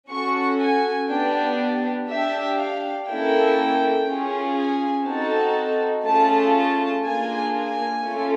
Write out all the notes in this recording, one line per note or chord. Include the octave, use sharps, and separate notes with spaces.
C#4 F#4 A4 C#6
G#5
B3 D4 G4 G5
D4 G4 E5
F5
A#3 C#4 E4 A4 G5
C#4 F4 G#4
G#5
C4 D#4 F#4 A4 A5
A3 C#4 F4 G#4 A5
A5
A#3 D4 F4 G#4 G#5
G#5
A3 C#4 F4 A4